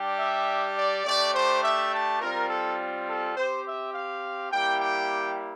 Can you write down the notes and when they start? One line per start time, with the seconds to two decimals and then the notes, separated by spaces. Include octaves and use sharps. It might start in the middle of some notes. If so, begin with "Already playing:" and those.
Already playing: G3 D4 G4
0.18 E5
0.76 D5
1.05 A3 D4 G4 D5
1.33 C5
1.63 E5
1.92 A5
2.20 G3 C4 F4 A#4
2.49 A4
3.08 A4
3.36 C4 G4 C5
3.65 E5
3.93 F5
4.51 G3 A#3 E4 G4 G5
4.81 G5